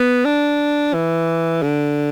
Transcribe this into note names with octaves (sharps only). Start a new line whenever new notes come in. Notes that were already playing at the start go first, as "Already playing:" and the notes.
Already playing: B3
D4
E3
D3